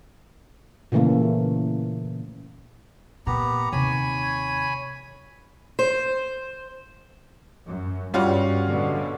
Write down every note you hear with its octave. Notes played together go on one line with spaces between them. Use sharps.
A#2 C#3 E3 A3 A#3
A#2 B3 G4 A#5
D#2 C3 C#5 G#5 B5
C5
F#2
G2 G3 C#4 F4 F#4
B2 D3